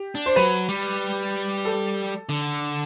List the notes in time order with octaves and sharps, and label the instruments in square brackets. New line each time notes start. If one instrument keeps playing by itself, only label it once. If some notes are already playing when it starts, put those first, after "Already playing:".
Already playing: [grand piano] G4
[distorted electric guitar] D4
[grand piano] C5
[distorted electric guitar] F#3 [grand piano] B4
[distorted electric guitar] G3
[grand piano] A4
[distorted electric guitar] D3